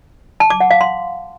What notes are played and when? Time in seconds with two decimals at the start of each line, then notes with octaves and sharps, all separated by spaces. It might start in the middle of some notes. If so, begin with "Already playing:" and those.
0.40 A5
0.50 D6
0.60 F#5
0.71 F5
0.81 C6